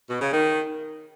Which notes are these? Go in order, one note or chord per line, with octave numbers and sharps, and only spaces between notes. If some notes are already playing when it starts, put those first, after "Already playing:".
B2
C#3
D#3